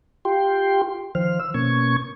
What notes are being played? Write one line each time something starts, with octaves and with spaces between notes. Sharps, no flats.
F4 G4 G5 C6
D#3 F3 C5 F6
E6
B2 A#3 C#4 C#6 G#6